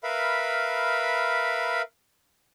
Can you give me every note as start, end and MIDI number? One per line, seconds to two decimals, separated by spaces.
0.03 1.82 70
0.03 1.82 71
0.03 1.82 76
0.03 1.82 77
0.03 1.82 83